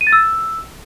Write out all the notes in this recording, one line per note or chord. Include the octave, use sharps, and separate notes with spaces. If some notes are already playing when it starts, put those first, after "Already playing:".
D#7
A6
E6